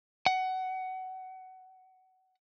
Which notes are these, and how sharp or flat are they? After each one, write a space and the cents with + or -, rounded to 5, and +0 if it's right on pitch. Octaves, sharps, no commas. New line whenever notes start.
F#5 +20